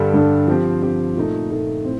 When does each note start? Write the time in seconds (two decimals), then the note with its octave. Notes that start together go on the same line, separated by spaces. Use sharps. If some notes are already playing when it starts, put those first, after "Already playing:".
Already playing: G2 D3 G3 D4 A4
0.14 G2 D3 G3 D4 A4
0.47 F3 C4 G4
0.82 F3 C4 G4
1.16 A#2 A3 D#4 A4
1.51 A#2 A3 D#4 A4
1.85 A2 C4